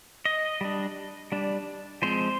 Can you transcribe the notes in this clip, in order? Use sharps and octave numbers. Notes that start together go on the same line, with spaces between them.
D#5
G3 D4
G3 D4
F3 G#3 C4 C5